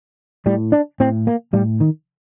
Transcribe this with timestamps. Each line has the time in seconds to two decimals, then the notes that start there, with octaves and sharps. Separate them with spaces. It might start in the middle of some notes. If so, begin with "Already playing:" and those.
0.46 A2 G3
0.72 D4
1.00 A2 C4
1.27 A#3
1.53 A2 G3
1.80 D#3